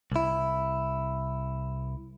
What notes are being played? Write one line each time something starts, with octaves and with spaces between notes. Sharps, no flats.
C2 E4